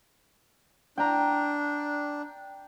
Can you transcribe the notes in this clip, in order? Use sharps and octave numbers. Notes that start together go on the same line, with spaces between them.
D4 G5 A#5